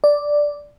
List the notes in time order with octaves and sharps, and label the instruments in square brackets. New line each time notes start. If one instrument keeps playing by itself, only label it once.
[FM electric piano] D5